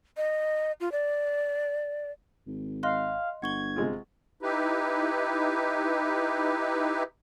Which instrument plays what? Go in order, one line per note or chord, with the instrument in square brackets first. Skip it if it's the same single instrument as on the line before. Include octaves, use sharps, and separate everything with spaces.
[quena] D#5
F4
D5
[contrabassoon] G#1
[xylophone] D#5 C6 F#6 [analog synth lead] F5
[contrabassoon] G1 [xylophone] F#5 C#6 G7 [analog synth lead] G#6
[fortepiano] C3 G#3 F4
[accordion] D#4 E4 G4 B4